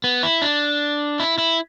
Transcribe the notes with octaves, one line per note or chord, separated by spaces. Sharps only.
B3
E4
D4
E4
E4